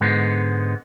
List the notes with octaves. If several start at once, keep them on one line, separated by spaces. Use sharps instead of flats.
G#2 D3 G#3 B3